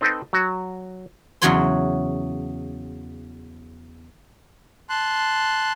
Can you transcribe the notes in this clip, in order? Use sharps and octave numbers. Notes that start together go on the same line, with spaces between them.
C4 D#4 A4 B4 C5 G5
F#3 F#4
E2 C#3 F#3 F#4 C#5 C6
A5 C6 F#6